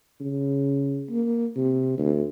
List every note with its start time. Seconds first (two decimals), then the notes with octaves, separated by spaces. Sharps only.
0.20 C#3
1.10 A#3
1.56 C3
1.98 D2